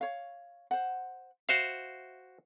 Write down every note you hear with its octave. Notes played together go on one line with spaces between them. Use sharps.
C#5 F5
C5 F#5
F#4 C5 E5 F5